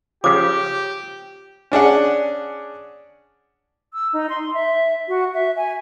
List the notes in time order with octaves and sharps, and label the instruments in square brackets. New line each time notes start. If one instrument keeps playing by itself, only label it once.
[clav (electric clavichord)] C#3 F3 [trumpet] G4 [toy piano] D6
[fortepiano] C#4 D4 G#4 F#5
[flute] E6
D#4
C6
E5
F#4
E5
G#5